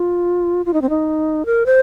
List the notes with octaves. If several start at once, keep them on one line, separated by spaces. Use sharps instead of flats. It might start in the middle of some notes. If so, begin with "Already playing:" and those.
Already playing: F4
F4
D#4
C4
D#4
A#4
C5